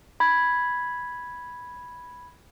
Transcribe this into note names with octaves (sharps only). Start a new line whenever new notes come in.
B5 G#6